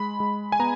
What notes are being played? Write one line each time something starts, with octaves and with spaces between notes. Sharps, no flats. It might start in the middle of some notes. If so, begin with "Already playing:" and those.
Already playing: G#3 B5
G#3
G#5
B3 A#5